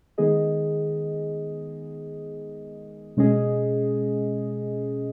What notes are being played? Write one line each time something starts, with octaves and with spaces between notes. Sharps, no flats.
D#3 G#3 B3 G#4 D#5
B2 G#3 C#4 G#4 D#5